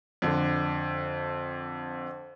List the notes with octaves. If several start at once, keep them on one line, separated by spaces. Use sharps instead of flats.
F2 D3